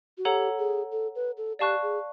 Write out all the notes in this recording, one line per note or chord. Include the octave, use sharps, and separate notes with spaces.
F#4
G4 A4 C#5 F#5 A#5
G#4
A4
B4
A4
G4 D5 F5 A5 C#6 F#6
G#4